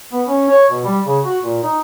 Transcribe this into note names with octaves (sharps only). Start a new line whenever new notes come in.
B3
C#4
C#5
B2
G3
C#3
F#4
A#2
D#4